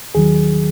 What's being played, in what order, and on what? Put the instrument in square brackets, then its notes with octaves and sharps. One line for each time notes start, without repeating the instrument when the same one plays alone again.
[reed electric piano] D#2 D#3 F#3 G#4